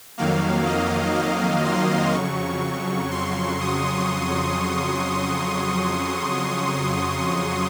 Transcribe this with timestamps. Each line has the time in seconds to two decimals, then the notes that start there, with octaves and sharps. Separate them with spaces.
0.18 F2 D#3 F#3 A#3 F5
0.66 D#5
1.15 D#5
1.65 C6
2.13 F2 C#3 F#3 C#6
3.11 C6
3.61 D#6